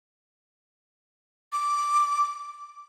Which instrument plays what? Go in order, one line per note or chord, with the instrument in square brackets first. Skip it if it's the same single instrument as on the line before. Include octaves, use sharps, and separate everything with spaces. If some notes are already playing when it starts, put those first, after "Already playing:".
[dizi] D6